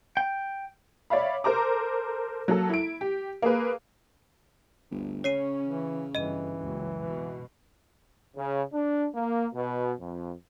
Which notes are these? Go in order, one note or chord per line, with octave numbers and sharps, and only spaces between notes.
G5
C#5 D5 E5 F5 B5
A4 A#4 C5 A#5 D6
F#3 A#3 A4
E4 D7
G4
A#3 G#4 B4
G1 D2
C#3 C#4 C#5 C7 D#7
E3
G1 E3 D#5 D#7
F#1 C#2 F#3
B2
C#3
D4
A#3
B2
F2